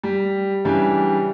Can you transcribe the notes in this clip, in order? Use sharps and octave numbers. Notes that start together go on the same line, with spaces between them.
G3
C#3 E3 G3 D4